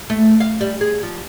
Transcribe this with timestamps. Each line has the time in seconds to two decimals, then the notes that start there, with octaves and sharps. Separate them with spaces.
0.10 A3
0.40 F5
0.61 G3
0.81 G#4
1.03 F3